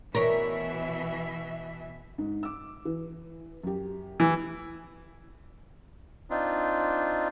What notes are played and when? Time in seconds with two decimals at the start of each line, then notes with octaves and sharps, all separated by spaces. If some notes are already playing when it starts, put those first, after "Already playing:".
0.15 B2 E3 A#4 C#5 E5
2.18 G#2
2.43 D6 E6
2.85 E3
3.63 F#2 G4
4.20 E3
6.30 C4 D4 D#4 F4